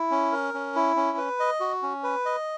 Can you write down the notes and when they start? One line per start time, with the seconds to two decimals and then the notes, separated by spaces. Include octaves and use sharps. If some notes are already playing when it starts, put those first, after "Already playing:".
Already playing: E4
0.11 C#4
0.32 A#4
0.54 C#4
0.75 E4
0.96 C#4
1.17 B4
1.40 D#5
1.60 F#4
1.83 C#4
2.03 B4
2.25 D#5